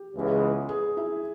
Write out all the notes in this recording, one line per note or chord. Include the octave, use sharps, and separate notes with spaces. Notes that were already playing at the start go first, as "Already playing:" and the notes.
Already playing: G4
C#2 C#3 E3 G#3 B3
G#4
E4 E5